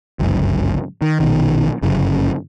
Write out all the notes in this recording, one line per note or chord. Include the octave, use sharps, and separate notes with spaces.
G1 C#2 F#2
D#3
A#1 B2 D#3
G1 F#2 C#3